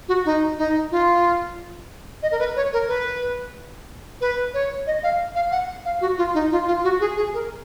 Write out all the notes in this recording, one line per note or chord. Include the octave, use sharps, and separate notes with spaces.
F#4
D#4
D#4
F4
D#5
A#4
B4
C#5
A#4
B4
B4
C#5
D#5
F5
F5
F#5
F5
F#4
F4
D#4
F4
F4
F#4
G#4
G#4
A#4